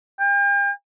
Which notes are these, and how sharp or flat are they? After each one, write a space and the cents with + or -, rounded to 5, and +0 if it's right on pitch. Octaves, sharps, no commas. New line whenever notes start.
G5 +40